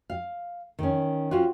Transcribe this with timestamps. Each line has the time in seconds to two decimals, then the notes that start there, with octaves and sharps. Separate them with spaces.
0.10 F5
0.79 D#3 C#4
1.31 C4 C#4 F4 F#4